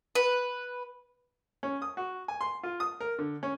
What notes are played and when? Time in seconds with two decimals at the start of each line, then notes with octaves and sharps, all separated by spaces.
0.15 B4
1.63 C#4
1.82 D#6
1.97 F#4
2.28 G#5
2.41 C6
2.63 F4
2.80 D#6
3.01 A#4
3.19 D3
3.43 C#4